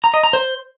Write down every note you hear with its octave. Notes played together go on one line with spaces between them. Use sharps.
A#5
D#5
A#5
C5